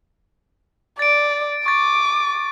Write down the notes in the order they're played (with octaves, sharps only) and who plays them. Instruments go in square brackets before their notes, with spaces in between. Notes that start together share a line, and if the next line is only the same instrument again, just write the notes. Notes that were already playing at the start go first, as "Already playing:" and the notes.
[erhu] D5 [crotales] A6 D7
[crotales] C#6 A6 [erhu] D6